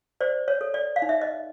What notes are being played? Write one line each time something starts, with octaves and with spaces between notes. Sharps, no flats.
C5 D5
C#5
A4
D5
F5
D#4
E5
D#5